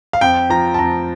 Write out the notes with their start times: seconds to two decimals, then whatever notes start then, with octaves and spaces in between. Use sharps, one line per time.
0.13 F5
0.21 F2 G5
0.50 F3 A#5
0.74 A5
0.79 F2 A#5